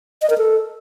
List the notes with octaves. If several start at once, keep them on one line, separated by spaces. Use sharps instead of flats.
D#5
A#4
A4